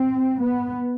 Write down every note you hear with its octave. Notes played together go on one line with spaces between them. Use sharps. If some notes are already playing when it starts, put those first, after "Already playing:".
Already playing: C4
B3